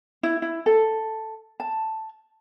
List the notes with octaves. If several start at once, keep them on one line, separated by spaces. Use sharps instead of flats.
E4
E4
A4
A5